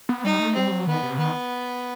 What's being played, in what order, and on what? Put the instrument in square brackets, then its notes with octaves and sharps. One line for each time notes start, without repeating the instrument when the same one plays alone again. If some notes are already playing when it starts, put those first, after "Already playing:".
[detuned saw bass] B3
[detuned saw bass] G3 [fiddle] D#4
[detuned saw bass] A3
[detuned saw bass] G3 [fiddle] C4
[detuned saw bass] F#3
[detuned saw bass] D#3 [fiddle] B3
[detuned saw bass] C3
[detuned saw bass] D#3 [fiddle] B3